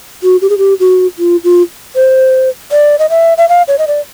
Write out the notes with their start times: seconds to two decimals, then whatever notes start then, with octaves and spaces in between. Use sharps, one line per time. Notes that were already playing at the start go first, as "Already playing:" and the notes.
0.23 F#4
0.42 G4
0.50 G#4
0.58 G4
0.80 F#4
1.18 F4
1.44 F4
1.95 C5
2.72 D5
2.99 D#5
3.10 E5
3.38 E5
3.49 F5
3.68 C#5
3.78 D#5
3.87 D5